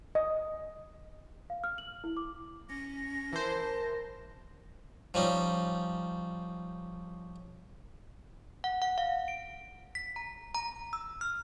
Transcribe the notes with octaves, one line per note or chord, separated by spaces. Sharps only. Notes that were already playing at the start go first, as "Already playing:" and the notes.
D#5
F5
F6
F#7
E4
D6
C#4 A#6
E3 A#4 C5 A5
F3 G3 C#4 D#4
F#5
F#5
F5
D7
B6
A#5
A#5
E6
F6